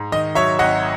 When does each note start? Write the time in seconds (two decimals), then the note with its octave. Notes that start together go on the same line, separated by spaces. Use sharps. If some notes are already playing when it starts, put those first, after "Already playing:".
Already playing: G#2
0.12 D#3 D#5
0.35 F#3 C#5 E5
0.59 G#1 D#5 F#5